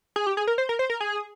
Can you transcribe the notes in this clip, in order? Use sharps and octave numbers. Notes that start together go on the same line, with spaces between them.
G#4
G4
G#4
A#4
C5
A#4
C5
A#4
G#4